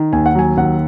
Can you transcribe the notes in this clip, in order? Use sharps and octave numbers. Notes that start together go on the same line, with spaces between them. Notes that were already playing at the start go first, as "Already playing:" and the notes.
Already playing: D#3
D#2 G#5
F#5
F#3 G#5
D#2 F#5